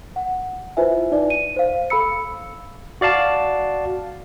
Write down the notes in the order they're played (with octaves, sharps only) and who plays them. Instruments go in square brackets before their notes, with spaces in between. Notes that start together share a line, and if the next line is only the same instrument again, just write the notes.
[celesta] F#5
E4 F4 B4 C5 E5 G#5
D#4 D5
D#7
C5 F5
A4 F5 B5 E6 C#7
[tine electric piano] F#4 D5 F5 A5